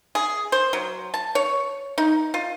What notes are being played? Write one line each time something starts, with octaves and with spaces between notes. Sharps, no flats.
G#4
C5
F#3
A5
C#5
D#4
F4